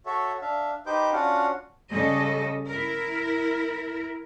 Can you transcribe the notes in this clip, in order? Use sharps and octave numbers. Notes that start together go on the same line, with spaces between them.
F#4 A4 C#5 E5
D4 E5 F5
D#4 G4 B4 C5 D6 G6
C#4 D4 F4 F#4 F5 F#5
C#3 G3 A4 D#5
E4 A#4